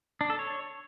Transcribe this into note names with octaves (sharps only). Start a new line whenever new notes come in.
D4
A4
C#5